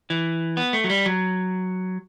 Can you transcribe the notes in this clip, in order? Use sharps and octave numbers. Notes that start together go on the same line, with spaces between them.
E3
B3
A3
F#3
G3
F#3